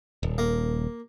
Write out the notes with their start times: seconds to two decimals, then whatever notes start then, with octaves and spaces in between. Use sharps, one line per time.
0.23 D#1
0.38 A#3